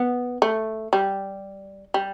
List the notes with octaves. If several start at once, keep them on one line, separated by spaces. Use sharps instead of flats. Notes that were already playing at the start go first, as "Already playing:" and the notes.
Already playing: B3
A3
G3
G3